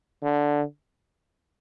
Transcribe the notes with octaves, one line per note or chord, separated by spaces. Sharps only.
D3